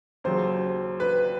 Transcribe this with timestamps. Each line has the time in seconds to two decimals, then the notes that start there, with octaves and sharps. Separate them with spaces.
0.24 D#2 C#3 F#3 C5
1.00 B4